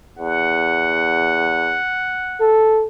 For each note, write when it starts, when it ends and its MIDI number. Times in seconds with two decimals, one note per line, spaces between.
0.18 1.78 40
0.18 2.53 78
2.40 2.87 69